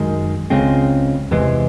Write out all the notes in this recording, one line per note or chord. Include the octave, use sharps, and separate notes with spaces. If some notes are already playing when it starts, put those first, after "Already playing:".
Already playing: F#2 D#3 G#3
C#2 C#3 G#3 C4
E2 C3 E3 G#3